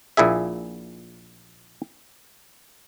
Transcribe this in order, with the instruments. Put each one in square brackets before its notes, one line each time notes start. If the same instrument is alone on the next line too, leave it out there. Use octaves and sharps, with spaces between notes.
[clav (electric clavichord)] A#1 A#2 E4 G#4 E5